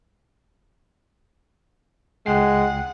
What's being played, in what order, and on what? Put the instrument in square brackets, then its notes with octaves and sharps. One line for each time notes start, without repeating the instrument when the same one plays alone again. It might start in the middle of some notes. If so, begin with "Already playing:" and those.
[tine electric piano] C#2 G5 C7 [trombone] G#3 [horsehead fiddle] F#5